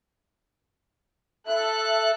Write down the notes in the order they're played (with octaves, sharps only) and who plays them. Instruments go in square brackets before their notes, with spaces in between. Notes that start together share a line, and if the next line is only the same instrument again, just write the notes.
[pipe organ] A4 F#6 [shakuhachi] E5